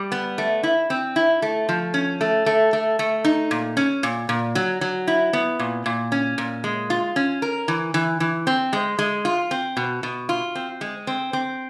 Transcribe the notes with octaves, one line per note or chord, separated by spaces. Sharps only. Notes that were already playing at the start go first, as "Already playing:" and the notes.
Already playing: G3
B3
A3
E4
C4
E4
A3
F3
C#4
A3
A3
A3
A3
D#4
A#2
C#4
A#2
A#2
F#3
F#3
E4
B3
A#2
A#2
C#4
A#2
G#3
F4
C#4
A#4
E3
E3
E3
C4
G#3
G#3
F4
C4
B2
B2
F4
C4
G#3
C4
C4